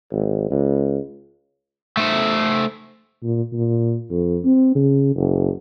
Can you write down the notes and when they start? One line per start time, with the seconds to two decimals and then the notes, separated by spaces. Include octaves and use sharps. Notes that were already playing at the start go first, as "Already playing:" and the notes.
0.12 G#1
0.50 C#2
1.97 A3 C5
3.23 A#2
3.53 A#2
4.11 F2
4.44 C4
4.75 C#3
5.16 F#1